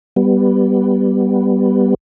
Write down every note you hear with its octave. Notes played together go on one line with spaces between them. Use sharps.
G3 B3